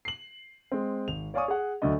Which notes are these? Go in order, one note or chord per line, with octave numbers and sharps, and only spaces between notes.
C7 F#7
G#3 C4
G#1 F7
C#5 D5 F5 G#5 C#6 D#6
G#4 F#5
D2 F#3 A3 D4 D#5